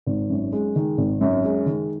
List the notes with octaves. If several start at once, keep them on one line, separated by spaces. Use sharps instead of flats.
G#1
F#2
G#3
D#3
G#1
F#2
G#3
D#3